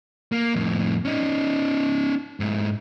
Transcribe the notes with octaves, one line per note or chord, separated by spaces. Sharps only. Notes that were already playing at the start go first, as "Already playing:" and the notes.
A#3
F2 A2
C#4 D#4
G#2 E4